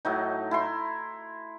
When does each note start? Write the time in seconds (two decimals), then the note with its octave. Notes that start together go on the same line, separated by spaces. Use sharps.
0.05 A2 F#3 D#4
0.51 E4 A#5 C6